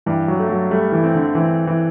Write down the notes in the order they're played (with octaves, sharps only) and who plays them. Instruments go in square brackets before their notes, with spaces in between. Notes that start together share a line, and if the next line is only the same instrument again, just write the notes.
[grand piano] G2 [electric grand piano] E3
[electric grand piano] F#3
[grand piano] A3
[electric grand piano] F#3
[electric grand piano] G3 [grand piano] A3
[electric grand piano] E3
[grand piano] C4
[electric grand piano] D3
[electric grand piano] E3 [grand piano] C4
[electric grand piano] E3